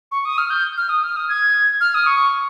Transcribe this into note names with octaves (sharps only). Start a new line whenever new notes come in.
C#6
D#6
F6
G6
F6
D#6
F6
D#6
G#6
F6
D#6
C#6